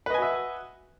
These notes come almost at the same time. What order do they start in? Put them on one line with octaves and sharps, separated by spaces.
B4 D#5 G#5 F#4 E5